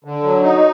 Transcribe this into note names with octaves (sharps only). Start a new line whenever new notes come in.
D3
F#3
D#4